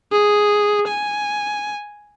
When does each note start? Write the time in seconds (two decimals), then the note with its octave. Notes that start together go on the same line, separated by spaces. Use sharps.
0.12 G#4
0.88 G#5